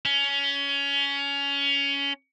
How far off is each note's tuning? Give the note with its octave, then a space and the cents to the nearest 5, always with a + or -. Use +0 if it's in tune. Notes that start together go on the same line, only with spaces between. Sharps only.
C#4 +20